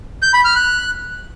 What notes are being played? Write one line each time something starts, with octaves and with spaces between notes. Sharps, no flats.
G6
B5
F6
F#6